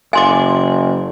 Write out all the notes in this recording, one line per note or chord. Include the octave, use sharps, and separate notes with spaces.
F#1 G#5 C6 D6